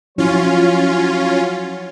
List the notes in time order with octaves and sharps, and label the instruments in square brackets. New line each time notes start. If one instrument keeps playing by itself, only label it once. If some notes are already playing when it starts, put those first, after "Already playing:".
[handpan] F3 E4 [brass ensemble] F#3 C#5 [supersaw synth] C#4 F4